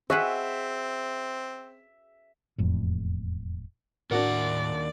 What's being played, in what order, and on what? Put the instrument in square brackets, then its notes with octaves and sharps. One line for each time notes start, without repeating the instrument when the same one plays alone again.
[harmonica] C4 [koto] F#4 G#4 B4 [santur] E5
[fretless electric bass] E1 F2 A2
[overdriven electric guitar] D#2 F#5 [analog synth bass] A2 [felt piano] D4 F#4 A#4 [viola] D5